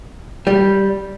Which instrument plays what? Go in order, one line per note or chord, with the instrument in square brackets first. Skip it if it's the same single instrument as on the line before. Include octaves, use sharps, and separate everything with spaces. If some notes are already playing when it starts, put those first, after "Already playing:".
[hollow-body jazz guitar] G3